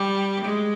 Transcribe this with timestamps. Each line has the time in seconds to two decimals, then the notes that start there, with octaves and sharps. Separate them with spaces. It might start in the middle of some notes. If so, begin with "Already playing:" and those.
Already playing: G3
0.45 G#3